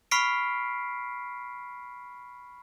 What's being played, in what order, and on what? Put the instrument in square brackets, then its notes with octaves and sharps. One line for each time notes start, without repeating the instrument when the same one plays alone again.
[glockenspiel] B5 C#6 F6 B6 C7 D7